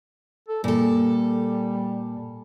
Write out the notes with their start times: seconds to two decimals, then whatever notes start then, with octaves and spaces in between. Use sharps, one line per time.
0.49 A4
0.64 A#2 G3 A4